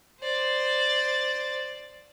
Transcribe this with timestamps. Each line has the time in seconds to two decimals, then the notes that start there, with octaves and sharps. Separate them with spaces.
0.21 C5 D5